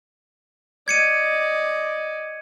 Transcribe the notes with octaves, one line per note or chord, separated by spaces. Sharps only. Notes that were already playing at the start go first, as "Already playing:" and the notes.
D5 D#5 G#6 C#7 D#7